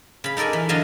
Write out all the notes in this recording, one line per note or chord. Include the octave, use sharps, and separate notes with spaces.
C#3 B5
D#4 A4 A#4 D5 G#5
E3
D3 F#3 D#5 F5 G#5 A5